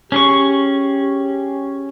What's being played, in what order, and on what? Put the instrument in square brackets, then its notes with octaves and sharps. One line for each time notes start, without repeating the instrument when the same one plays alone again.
[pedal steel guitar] C#4 G#4 C#6 [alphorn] G4